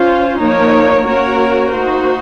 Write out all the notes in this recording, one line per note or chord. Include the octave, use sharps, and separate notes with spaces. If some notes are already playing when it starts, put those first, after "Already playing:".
Already playing: C#4 F4 C5
F3 A#3 D#4 A#4 C#5
A#3 C#4 F#4 A#4 C#5
A#3 D#4 F#4 C5